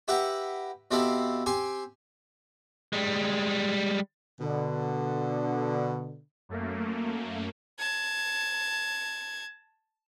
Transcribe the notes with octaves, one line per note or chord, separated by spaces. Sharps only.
E4 G4 B4 F#5 G5 A#5
B2 C4 E4 G4 A4 F5
C4 G4 G#5 C6
G3 G#3
B2 D3
F#2 A3 A#3
A5 G#6